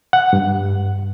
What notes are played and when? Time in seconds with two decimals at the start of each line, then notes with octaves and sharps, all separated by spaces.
0.13 F#5
0.33 G2